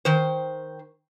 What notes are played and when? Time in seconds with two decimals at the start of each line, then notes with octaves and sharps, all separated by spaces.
0.05 D#3 C5